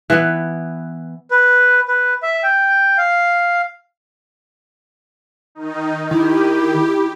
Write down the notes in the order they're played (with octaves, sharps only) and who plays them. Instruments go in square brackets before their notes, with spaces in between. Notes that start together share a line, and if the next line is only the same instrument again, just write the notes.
[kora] E3 B3
[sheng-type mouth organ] B4
B4
E5
G5
F5
[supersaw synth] D#3 D#4
[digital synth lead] D#3 [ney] E4 [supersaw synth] G4